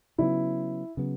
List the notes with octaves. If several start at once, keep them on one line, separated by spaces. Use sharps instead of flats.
C#3 F#3 B3 E4
C#3 F#3 B3